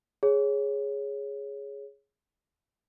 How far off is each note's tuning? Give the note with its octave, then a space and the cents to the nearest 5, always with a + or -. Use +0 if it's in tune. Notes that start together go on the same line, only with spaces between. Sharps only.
G#4 +0 C#5 +0